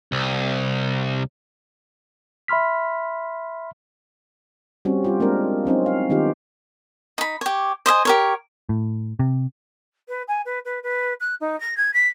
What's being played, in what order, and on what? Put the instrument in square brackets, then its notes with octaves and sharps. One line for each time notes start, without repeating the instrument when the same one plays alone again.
[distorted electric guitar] C2
[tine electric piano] E5 B5 C6 F6 B6
[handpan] G3 C4 C#4 F#4
G3 F4 G4
G#3 A#3 C4 D4 A#4
F#3 C4 C#4 D#4
F5
D#3 B3 D#4 F4 G4
[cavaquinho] D#4 B5
G4 C#5
C5 D#5 E5 G#5
G4 A#4 C#5
[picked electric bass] A2
C3
[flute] B4
G#5
B4
B4
B4
F#6
D#4
A#6
G#6
B6